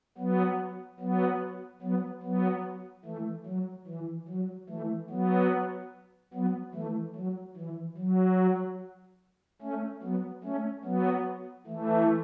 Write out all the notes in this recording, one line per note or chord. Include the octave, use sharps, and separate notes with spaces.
F#3 B3
F#3 B3
F#3 B3
F#3 B3
E3 A3
F#3
E3
F#3
E3 A3
F#3 B3
F#3 B3
E3 A3
F#3
E3
F#3
A3 C#4
F#3 B3
A3 C#4
F#3 B3
E3 A3